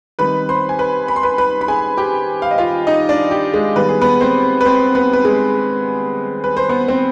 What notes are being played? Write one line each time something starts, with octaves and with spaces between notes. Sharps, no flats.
D#3 G3 C4 D#4 B4 B5
C5 C6
G#5
B4 B5
B5
C6
B4 B5
B4 B5
B5
G#4 G#5
G4 G5
F5
D#5
F4 F5
D#4 D#5
D4 D5
G4
G#3 G#4
D#3 G3 B3 B4
G#4
B3 B4
C4 C5
B4
C4 C5
B3 B4
B4
G#3 G#4
B4
C5
B3 B4
C4 C5